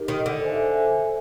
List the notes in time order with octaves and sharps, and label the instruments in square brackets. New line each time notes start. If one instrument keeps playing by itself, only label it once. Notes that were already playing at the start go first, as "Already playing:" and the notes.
Already playing: [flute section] D#4 G4 A#4 D#5
[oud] D#3
D3
[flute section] C5 E5 G#5